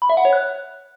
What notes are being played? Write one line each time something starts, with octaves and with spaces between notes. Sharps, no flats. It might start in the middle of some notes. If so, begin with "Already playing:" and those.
B5
E5
F#5
C#5
F#6